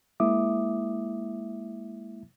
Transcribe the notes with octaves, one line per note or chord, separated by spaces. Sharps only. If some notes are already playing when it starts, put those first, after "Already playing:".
G#3 A#3 E4 E5 D6 D#6